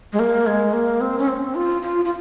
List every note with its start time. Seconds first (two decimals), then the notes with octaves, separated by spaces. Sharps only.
0.13 G#3
0.19 A#3
0.47 G#3
0.73 A#3
1.01 C4
1.19 C#4
1.28 C4
1.55 F4
1.82 F4
2.05 F4